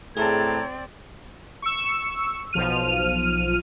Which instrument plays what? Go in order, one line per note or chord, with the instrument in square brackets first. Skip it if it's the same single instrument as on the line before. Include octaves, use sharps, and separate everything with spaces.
[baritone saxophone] A2 [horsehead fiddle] C4 D5 [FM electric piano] G#4 E5 A5 [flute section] A#5 G#6
[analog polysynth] C#6 E6
B1 F3 F6 D#7